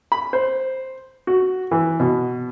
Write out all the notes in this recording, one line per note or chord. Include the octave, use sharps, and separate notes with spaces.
B5
C5
F#4
E3
B2